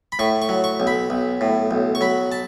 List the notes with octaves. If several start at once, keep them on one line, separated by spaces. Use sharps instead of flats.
B5
A2 C#6
C#6
F#3
C#6
B1
B5
B1
A2
B1
C#6
F#3 B5
A5